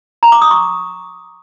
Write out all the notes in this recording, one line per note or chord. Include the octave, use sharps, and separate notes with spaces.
A#5
D6
D#6
C#6